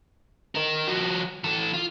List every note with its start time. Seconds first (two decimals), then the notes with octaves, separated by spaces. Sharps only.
0.55 A#4 D#5
0.88 F3 F#4
1.44 E3 A4
1.73 F4